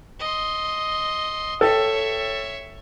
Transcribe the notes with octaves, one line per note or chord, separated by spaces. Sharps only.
D#5 C6
A4 C#5 E5 G5